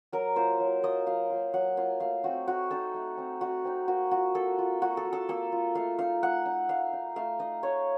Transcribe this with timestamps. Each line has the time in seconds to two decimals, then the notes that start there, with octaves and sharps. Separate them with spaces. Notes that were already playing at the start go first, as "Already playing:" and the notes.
0.12 F#3 A#4
0.36 A#3 F4 C5
0.60 F#3
0.83 A#3 F4 D#5
1.07 F#3 F5
1.30 A#3 F4
1.54 F#3 F#5
1.77 A#3 F4 F5
2.00 A3 F5
2.23 C4 D#4 F#4
2.47 A3 F#4
2.71 C4 D#4 A4
2.94 A3
3.17 C4 D#4
3.41 A3 F#4
3.65 C4 D#4
3.88 A#3 F#4
4.11 F4 F#4
4.35 A#3 A4
4.58 F4
4.82 A#3 F#4
4.97 A4
5.05 F4
5.13 A4
5.29 A#3 A4
5.52 F4
5.75 A3 F5
5.99 D#4 F5
6.22 A3 F#5
6.46 D#4
6.69 A3 F5
6.93 D#4
7.16 A3 F5
7.39 D#4 D#5
7.63 A3 C#5